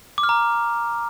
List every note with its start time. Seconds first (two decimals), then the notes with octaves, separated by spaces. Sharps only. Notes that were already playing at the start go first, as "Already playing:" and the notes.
0.18 D6
0.23 F6
0.29 A#5